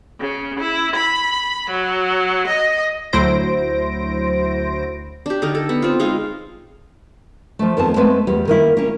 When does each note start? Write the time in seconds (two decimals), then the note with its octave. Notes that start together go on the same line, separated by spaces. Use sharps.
0.20 C#3
0.59 E4
0.96 B5
1.71 F#3
2.48 D#5
3.13 D2 F#3 E4 C5 A#6 D7
5.26 D4 G4
5.42 D3 D#4 A#4
5.55 A4
5.69 B3
5.82 C4 F4
6.00 G#3 D#4 F4 F5
7.59 F3 A3
7.77 F2 D#3 B3 C4 A5
7.96 G#3 A3 B3 C4 B4
8.27 E2 G3
8.48 D#3 A#3 E4
8.77 A#3 C#4